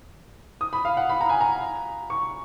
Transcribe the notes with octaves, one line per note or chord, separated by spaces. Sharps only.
D#6
B5
F5
F#5
B5
A#5
G#5
A#5
C#6